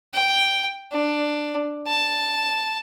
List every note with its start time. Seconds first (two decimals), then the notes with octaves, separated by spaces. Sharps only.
0.14 G5
0.92 D4
1.87 A5